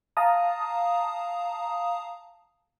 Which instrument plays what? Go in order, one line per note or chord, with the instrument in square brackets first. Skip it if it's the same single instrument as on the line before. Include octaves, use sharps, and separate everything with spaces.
[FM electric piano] F5 A5 A#5 D#6